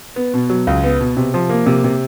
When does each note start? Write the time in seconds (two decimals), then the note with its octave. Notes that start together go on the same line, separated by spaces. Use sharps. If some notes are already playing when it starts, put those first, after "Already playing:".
0.16 B3
0.33 B2
0.50 F#3
0.67 C#2
0.83 B3
0.99 B2
1.17 C3
1.34 F3
1.49 A#3
1.66 C3
1.84 C3